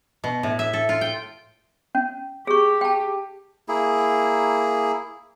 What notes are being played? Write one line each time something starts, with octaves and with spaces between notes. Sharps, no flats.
B2
A2
E5
A4
F4
G5
C#4
G4 G#4 C#6
G5 A5
A#3 E4 G#4